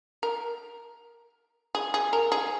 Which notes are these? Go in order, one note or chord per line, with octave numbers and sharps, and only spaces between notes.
A#4
G#4
G#4
A#4
G#4